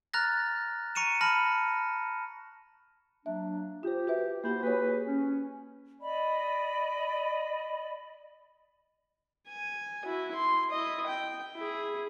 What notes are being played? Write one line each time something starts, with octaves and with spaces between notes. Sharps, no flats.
A#5 F6 F#6 A6 A#6
A#5 C#6 C#7 D#7 E7
A5 B5 F6 A#6
F#3 A#3 D4 E5
F4 G4 C5
F#4 B4 E5
A#3 E4 F#4 G4 C5
A#3 F#4 G#4 B4 C#5
C#4
D5 D#5 B5
G#5
E4 F#4
C6
E4 D#5
G5
E4 G#4